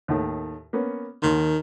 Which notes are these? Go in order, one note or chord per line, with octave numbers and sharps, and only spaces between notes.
D#2 A2 D#3
A#3 B3 C#4
D#2 D#3 C6